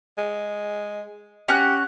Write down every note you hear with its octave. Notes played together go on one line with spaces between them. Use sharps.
G#3
C#4 F#4 G4 F#6